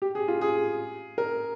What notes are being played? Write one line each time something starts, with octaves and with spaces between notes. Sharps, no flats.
G4
G#4
F4
G#4
A#4